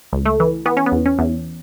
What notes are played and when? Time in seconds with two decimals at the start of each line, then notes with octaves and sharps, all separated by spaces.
0.13 C#2
0.26 A3
0.40 E3
0.66 E3 B3
0.77 C#4
0.86 B3
0.92 E2
1.06 C#4
1.19 E2